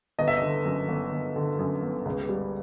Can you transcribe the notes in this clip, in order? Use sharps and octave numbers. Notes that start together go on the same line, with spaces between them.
G1 D#5
E5
D#5
D3
F#2
G1
G1
D3
F#2
G1
C#2
G3